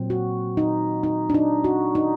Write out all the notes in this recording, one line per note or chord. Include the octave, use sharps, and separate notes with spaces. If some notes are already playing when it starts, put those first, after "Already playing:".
Already playing: A#2 F#3 C4
F#4
D#4
D#4
D4
D#4
F#4
D#4